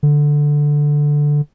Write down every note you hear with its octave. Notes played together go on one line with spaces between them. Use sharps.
D3